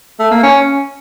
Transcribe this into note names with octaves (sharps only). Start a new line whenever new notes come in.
A3
A#3
C#4